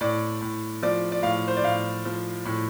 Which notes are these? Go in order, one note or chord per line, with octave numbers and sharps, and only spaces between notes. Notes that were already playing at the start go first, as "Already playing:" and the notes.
A2 D5
A2
F3 D5
D5
A2 F5
C5
D5
A2 F5
F3
A2